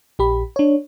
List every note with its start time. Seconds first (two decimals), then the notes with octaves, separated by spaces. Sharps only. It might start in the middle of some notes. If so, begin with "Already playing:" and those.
0.19 A#1 G4 B5
0.56 D4 C#5